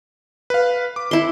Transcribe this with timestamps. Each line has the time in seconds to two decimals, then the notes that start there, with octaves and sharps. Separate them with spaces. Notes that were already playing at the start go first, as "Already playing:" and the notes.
0.50 B4 F5
0.96 D6
1.11 E4 C6